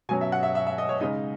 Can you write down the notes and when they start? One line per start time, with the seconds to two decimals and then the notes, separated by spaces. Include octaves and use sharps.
0.09 B2 F#3 C#4 G#5
0.21 E5
0.32 F#5
0.43 E5
0.55 E5
0.67 E5
0.78 D#5
0.89 C#5
1.01 C#3 G#3 D#4 D#5